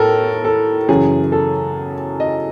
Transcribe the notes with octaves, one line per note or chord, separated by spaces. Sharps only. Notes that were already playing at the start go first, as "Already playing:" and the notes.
Already playing: A2 A4 A#4
A4
F#2 C#3 E3 G#4
A4
D#5